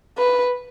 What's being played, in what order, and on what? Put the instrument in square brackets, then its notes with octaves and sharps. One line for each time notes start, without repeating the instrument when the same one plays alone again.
[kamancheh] B4